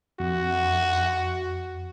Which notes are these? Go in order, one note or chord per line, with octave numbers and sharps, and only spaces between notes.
F2 F#4